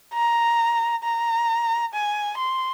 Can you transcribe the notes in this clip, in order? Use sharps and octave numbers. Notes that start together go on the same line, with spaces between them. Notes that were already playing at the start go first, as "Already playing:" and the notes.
A#5
A#5
G#5
C6